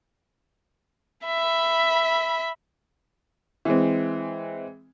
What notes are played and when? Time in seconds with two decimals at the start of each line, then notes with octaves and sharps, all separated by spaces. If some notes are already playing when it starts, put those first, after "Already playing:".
1.26 E5 B5
3.65 E3 G#3 C4